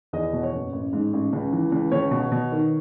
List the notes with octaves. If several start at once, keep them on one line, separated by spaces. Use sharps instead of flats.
E2 D#5
B2
C#5
F#1
A1
G#2
A1
C#2
E3
C#2
C#2 C#5
B2
B2
D#3